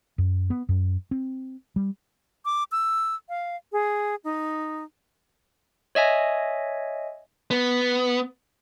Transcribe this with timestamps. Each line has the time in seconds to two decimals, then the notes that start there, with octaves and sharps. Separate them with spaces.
0.18 F#2
0.50 B3
0.69 F#2
1.11 C4
1.76 G3
2.45 D6
2.72 E6
3.29 F5
3.72 G#4
4.24 D#4
5.95 C#5 D#5 E5 G#5
7.51 B3